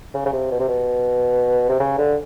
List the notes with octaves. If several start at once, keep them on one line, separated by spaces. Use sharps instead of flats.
C#3
C#3
C3
B2
C3
B2
C3
C#3
D3